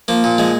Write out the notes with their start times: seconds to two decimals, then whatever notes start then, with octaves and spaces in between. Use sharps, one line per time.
0.08 F3 A#3
0.24 A#2
0.38 F3 G#3